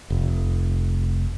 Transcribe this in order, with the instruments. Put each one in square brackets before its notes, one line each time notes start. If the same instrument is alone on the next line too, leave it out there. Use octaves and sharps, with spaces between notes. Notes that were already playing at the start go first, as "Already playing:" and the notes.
[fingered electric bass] F1